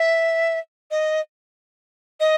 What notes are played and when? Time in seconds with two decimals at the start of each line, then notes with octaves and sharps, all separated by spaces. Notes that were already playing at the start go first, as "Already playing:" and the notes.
Already playing: E5
0.91 D#5
2.20 D#5